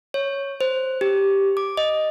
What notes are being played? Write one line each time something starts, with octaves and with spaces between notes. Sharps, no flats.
C#5
C5
G4
D6
D#5